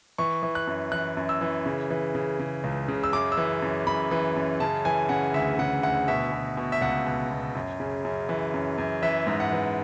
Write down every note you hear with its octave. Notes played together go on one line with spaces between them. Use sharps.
E3 C#6
E3
F#6
F#2
E3 F#6
F#2
E6
E3
C#3
E3
C#3
C#3
C#2
C#3
E6
F#2 D6
E6
E3
F#2
F#2 B5
E3
F#2
C#3 A5
E3 G#5
C#3 F#5
D2 E5
C#3 F#5
D2 F#5
B2 E5
B2
B2
E5
C#2 F#5
B2
B2
F#2
C#3
F#2
E3
F#2
F#2
E3 E5
G#2
F#5
E3